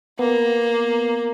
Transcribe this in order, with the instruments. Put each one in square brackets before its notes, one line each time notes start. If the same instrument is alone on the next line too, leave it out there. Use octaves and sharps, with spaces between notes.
[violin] A#3 [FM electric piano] B3